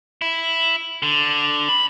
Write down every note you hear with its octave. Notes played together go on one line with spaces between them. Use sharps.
E4
D3
B5